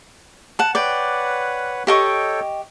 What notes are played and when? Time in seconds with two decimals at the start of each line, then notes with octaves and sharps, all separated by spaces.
0.59 F#5 A5
0.75 B4 C#5 D5 F#5 G5
1.87 G4 A4 C#5 D#5 G5 C#6